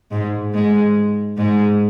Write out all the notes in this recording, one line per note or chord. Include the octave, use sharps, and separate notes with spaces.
G#2 G#3
G#2 G#3
G#2 G#3